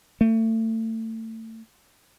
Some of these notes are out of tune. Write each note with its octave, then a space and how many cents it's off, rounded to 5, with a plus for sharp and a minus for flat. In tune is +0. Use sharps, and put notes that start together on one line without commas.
A3 +30